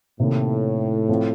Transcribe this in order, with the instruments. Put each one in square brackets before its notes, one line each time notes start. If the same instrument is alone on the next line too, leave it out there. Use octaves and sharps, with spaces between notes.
[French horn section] A2 [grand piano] C3 D#3 A#3
[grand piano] F3 C4 F4 A4